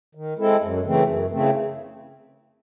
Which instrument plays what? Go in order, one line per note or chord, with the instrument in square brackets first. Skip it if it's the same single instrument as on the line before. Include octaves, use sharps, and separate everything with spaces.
[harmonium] D#3
G#3 C4 E4 A4
F#2
C#3 E3 A3 C4
F#2
C#3 E3 A3 C4